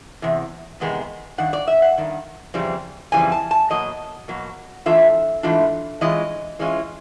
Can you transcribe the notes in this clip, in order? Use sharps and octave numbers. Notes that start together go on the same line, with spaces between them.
E2 C3
E2 C3 D#3 G#3 B3
G2 D#3 F#5
D5
E5
F#5
G2 D#3
F2 C#3 E3 G3 C4
F2 C#3 E3 G3 C4 G#5
A5
A5
B2 F#3 A#3 D#5
B2 F#3 A#3
G#2 E3 A3 D4 F4 E5
G#2 E3 A3 D4 F4
E3 G#3 C#4 F4 D#5
E3 G#3 C#4 F4